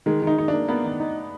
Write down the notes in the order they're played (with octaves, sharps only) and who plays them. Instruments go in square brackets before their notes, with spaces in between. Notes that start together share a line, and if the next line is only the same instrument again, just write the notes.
[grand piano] D#3 [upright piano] G#3
[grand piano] D#3 [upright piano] D#4
[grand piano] D#3 [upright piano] D#4
[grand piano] A#3 [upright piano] D4
[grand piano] A#3 [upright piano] B3
[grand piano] D#3
D#4